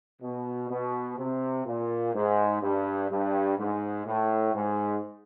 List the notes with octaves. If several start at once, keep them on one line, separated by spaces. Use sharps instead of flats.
B2
B2
C3
A#2
G#2
G2
G2
G#2
A2
G#2